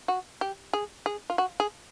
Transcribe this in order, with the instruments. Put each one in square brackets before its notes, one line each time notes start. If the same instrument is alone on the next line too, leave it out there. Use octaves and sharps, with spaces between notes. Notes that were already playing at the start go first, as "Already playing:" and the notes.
[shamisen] F#4
G4
G#4
G#4
F4
F#4
G#4